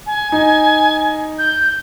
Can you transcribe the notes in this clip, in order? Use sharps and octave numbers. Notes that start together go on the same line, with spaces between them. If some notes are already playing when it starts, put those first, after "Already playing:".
G#5
D#4
G6